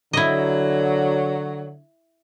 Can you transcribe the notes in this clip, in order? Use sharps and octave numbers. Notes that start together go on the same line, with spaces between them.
D3 F#3 E4 D#5